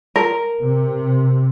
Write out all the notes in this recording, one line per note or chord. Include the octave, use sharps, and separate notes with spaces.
A#4
C3